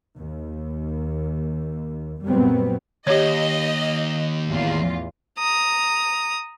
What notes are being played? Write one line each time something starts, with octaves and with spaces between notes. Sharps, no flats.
D#2
F#2 A#2 F#3 G3 B3 C4
D#2 G4 C#5 D#5
A1 E2 F4
A#5 D#6